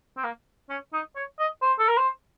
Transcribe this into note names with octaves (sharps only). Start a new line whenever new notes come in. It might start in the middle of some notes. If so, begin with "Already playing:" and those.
C4
A#3
C#4
D#4
C#5
D#5
C5
A4
A#4
C5